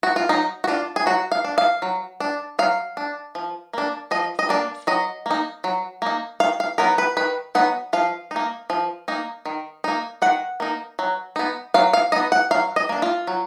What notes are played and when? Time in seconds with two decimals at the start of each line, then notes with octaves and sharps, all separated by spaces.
0.03 F#4
0.16 F4
0.29 F#3 D#4
0.64 F#4
0.67 D4 F4
0.96 G#4
1.06 F#3 F#4
1.32 F5
1.44 D4
1.58 F5
1.82 F#3
2.20 D4
2.59 F#3 F5
2.97 D4
3.35 F3
3.73 A#3 D4
4.11 F3 D#5
4.39 D#5
4.49 A#3 D4 D5
4.87 F#3 D#5
5.26 A#3 D#4
5.64 F#3
6.02 A#3 D#4
6.40 D#3 F5
6.60 F5
6.78 F#3 B3 D#4 A#4
6.98 B4
7.17 D#3 B4
7.55 F#3 B3 D#4 F#5
7.93 F3 F5
8.31 A#3 D#4
8.70 F3
9.08 A#3 D#4
9.46 D#3
9.84 A#3 D#4
10.22 D#3 F#5
10.60 A#3 D#4
10.99 F#3
11.36 B3 D#4
11.74 F#3 F5
11.93 F5
12.12 B3 D#4 D#5
12.32 F#5
12.51 F#3 F5
12.76 D#5
12.89 A#3 D4
13.02 F4
13.27 F#3